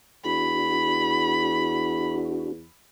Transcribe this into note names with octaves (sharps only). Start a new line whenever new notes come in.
E2 D4 F#4 B5